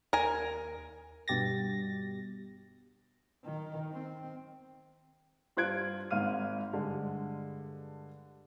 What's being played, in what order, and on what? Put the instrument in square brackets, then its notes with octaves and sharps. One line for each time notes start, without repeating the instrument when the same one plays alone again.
[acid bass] D#2 [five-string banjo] A#4 G#5
[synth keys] G2 B2 G4 A6 A#6
[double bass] D#3
C4
[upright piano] G2 F4 C5 F#6 G#6 D7
G#1 G#2 F5 F6 D#7
G2 D3 G#3